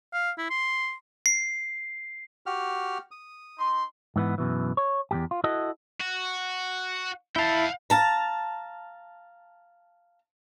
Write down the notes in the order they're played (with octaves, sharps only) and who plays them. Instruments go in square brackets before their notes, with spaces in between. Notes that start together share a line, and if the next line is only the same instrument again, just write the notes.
[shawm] F5
E4
C6
[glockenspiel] C7
[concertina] F#4 G4 F6
D#6
[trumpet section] D#4 C6
[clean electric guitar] G#2 E3 B3
F#2 B2 E3
C#5
E2 G#2 G4
F4
E4 F#4 A4 D#5
[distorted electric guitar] F#4
[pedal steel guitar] E4 A5 [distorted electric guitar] F5 G5
[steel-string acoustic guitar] F5 A5 A#5